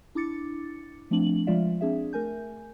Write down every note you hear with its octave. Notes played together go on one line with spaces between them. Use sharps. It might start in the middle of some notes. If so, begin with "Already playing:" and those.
D4 E4 D6 A6 C#7
F3 A3 C4 D4 F#7
F3 G#3 F4 D5 E5 F5
C4 D4 G#4 E5
A3 A#4 G#5 G6